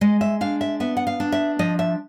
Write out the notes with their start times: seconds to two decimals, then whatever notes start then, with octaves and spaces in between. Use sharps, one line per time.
0.01 G#3 D#5
0.21 E5
0.41 D4 F5
0.61 E5
0.80 B3 E5
0.97 F#5
1.07 F5
1.20 D4
1.32 E5
1.59 F3 D#5
1.79 E5